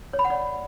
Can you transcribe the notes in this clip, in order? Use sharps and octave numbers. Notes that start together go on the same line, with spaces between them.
C#5
B5
F#5
D5